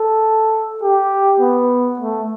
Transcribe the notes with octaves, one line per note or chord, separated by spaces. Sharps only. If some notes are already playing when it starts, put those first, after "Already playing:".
Already playing: A4
G4
B3
A3